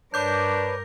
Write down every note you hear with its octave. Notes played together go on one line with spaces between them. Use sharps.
G2 D4 A#4 B4 C#5 D6 G6